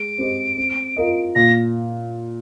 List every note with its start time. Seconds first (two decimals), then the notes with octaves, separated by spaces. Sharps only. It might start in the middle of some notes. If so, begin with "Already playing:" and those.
Already playing: G#3 D7
0.18 C4 G4 C5 D#5
0.57 C4
0.97 F4 A#4 D#5
1.35 A#2 A#6